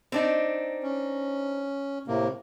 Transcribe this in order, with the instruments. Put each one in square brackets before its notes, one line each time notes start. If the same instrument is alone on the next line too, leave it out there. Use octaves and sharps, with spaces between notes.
[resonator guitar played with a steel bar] C4 D4 D#4
[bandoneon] C#4
A2 C3 A#3